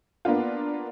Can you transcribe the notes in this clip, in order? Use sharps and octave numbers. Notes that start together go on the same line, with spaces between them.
A#3 B3 D4 F4